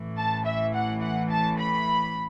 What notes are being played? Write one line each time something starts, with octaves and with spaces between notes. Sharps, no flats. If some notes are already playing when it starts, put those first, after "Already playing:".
Already playing: A1 A2 E3
A5
E5
F#5
F#5
A5
B5